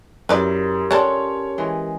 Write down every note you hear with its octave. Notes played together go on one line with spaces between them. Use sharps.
F#2 F#3 E4 G4 A#4 B4 D5
G3 C#4 D4 F4 A4 C#5
E3 G#3